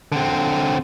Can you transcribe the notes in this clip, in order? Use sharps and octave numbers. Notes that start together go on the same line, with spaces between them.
D3 C4